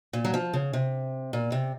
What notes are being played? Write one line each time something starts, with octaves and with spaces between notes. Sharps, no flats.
A#2
F#3
F3
C#3
C3
A#2
C3